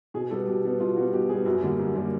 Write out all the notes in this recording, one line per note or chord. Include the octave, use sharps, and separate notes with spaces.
B2 G#4
G3 B3 A4
B2 G4
G3 B3
B2 F4
G3 B3 F#4
B2 G4
G3 B3 G#4
F#2 F#4
D3 G3 A#3
F#2
D3 G3 A#3